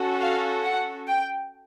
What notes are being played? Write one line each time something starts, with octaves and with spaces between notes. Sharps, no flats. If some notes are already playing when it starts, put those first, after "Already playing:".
Already playing: C#4 F#4 A4
F5
F#5
G5